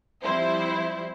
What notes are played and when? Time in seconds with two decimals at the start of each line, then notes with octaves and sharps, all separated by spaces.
0.22 F3 G3 C4 E4 C5